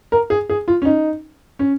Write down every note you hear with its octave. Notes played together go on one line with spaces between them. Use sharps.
A#4
G#4
G#4
F4
C#4
D#4
C#4